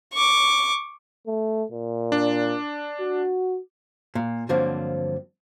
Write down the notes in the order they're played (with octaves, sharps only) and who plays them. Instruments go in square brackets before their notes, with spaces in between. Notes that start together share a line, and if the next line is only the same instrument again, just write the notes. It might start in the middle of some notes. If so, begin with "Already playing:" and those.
[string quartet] C#6 D6
[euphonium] A3
A#2
[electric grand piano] D4
[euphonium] F#4
[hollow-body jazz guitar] A#2
G2 D3 F3 F#3 A#3 C4